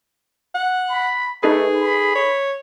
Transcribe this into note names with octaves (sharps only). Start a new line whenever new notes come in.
F#5
B5
A3 D#4 G#4 A4 B4
B5
C#5